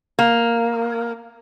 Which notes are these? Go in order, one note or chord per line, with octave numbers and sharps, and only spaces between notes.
A#3